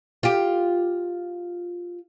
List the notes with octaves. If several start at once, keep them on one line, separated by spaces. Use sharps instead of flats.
F4 G4